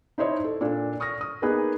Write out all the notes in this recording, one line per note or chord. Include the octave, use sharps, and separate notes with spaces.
D#4 E4 C5 C#5 D#5
A4
A#2 D4 A4
C#6 D#6 F6 A#6
D#6
A#3 B3 D#4 G#4 B4